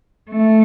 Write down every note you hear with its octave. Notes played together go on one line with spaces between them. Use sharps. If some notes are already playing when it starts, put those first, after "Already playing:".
A3